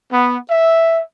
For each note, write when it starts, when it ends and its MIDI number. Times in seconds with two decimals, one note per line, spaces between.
0.12 0.37 59
0.50 1.00 76